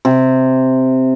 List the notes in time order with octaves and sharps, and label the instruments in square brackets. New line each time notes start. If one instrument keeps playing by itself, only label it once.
[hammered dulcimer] C3